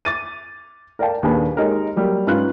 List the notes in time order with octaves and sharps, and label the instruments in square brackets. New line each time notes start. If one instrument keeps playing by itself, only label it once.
[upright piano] D6 A6 D#7
A#4 D5 F5 G5 A5
D#1 D#2 D4 G#4 B4
G#3 D#4 G4 A#4 C#5
F#3 G3 A#3
G#2 C#4 F4 B4 F#6